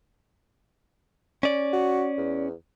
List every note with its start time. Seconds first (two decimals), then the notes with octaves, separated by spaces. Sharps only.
1.43 C#4 D5
1.73 F#4
2.18 E2